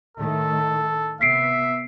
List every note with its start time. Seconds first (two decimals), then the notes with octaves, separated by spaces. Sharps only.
0.17 A2 D#3 A3 A4
1.21 C3 B3 E5 B6 C7 D7